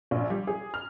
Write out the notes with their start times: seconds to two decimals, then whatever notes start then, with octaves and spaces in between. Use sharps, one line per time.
0.11 A#1
0.30 G3
0.47 G#4
0.74 F6